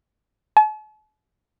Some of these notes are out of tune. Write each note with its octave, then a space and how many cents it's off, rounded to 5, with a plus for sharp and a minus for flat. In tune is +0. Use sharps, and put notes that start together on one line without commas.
A5 -45